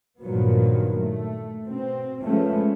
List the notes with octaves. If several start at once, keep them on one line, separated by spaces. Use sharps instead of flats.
G2 A#2 D#3 F3 F#3 B3
A3
B2 C4
F3 G#3 A3 B3 C#4